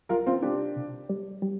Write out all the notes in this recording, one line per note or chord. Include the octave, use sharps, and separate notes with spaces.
C2 F4 A#4
C4 F4
C3 D4 G4
C2
G3
G3